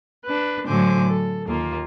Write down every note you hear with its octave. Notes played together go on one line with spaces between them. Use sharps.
D4 B4
A2 D3 F#3 C5 G#5 D6
A4
D#2 A#3 F4